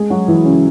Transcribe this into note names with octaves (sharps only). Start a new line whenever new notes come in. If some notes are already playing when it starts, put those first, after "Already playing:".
Already playing: G#3 G#4
F#3 F#4
E3 E4
C#3 C#4